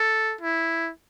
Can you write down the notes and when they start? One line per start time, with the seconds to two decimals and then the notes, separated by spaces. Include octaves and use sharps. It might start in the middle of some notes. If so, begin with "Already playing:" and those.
Already playing: A4
0.41 E4